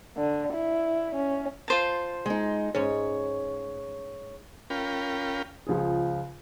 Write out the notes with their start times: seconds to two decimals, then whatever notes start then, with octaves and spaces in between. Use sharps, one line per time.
0.17 D3
0.53 E4
1.15 C#4
1.68 F4 C5 A5
2.26 G#3 D#4
2.75 G#2 C#4 C#5
4.70 C#4 F4 A#4 G5 B5
5.67 C#2 F3 G#4